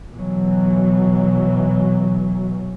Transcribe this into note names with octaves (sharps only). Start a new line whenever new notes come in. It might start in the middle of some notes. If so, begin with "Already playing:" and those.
B2 E3 F#3